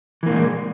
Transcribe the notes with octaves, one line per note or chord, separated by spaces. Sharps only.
A#2 E3 G#3 A#3